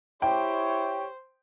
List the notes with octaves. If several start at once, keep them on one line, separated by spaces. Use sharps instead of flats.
E4 G4 C5 C#5 G5